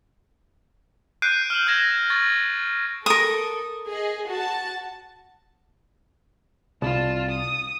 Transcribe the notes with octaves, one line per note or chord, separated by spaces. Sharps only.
F#6 G6 C7 D7 D#7
F6 E7 F#7
E6 G6 G#6 A#6 E7
C#6 A6
A4 A#4 D#6
G#4 D#5
F#4 A5
C2 F4 A5
D#6